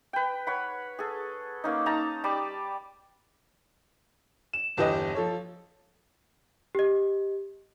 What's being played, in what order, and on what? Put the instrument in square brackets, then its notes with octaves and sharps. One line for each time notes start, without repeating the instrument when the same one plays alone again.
[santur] B4 G5
C#5 F#5 B5
G#4 A4
A#3 C#4 D#4
D#4 A5 A#5
G3 A5 B5 D6
[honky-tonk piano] E7
G1 E2 G4 B4 D#5 D#6
F3 A4 C#5
[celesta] G4 D#5